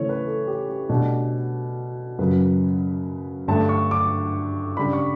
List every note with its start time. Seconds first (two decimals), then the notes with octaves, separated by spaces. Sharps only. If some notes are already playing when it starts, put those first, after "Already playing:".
Already playing: C#3 E3 A3 C#5 C#6
0.09 B4
0.25 A4
0.47 G4
0.69 G4
0.89 B2 A3 D4
2.19 F#2 C#3 F#3 B4
3.48 G2 D3 A3 D4 A5
3.69 C#6
3.91 D6
4.77 C#3 G3 D4 B5
4.93 C#6